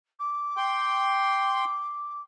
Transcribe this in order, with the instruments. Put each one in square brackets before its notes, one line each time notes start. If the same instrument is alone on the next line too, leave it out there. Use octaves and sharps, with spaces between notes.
[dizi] D6
[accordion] G5 C6